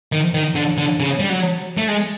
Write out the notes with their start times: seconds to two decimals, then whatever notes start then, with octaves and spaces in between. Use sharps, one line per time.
0.12 D#3
0.34 D#3
0.55 D3
0.78 D3
1.00 C#3
1.20 G3
1.29 F#3
1.78 A3
1.88 G#3